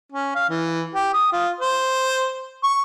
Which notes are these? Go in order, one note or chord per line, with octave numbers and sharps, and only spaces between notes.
C#4
F5
E3
G4
D#6
F4
C5
C#6